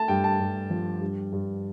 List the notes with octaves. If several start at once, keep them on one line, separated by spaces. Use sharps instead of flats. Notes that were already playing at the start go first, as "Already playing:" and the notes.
Already playing: A3 A5
G2 G5
A5
G2
F3
G2
G2